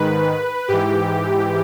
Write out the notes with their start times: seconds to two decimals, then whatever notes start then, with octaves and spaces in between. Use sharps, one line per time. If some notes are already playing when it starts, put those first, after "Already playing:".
Already playing: G#2 D#3 B4
0.68 G#2 E3 G4